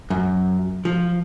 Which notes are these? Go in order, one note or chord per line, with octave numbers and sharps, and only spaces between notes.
F#2
F3